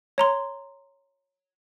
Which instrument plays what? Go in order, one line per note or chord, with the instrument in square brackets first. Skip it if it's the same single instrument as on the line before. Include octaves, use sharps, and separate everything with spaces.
[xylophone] C#5 A#5 C6